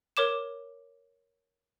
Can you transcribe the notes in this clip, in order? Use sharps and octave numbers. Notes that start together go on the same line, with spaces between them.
A#4 C#5 D6 E7